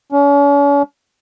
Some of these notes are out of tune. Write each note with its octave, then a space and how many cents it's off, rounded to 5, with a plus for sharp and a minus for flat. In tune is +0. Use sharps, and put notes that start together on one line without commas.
C#4 +40